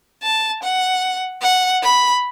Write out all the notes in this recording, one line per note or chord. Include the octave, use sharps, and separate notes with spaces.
A5
F#5
F#5
B5